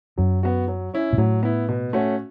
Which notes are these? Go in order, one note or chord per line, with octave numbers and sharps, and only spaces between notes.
F#2 F#3
B3 F#4
F#3
C#4 E4
B2
A2 F#3
B3 E4
B2
A3 C#4 F#4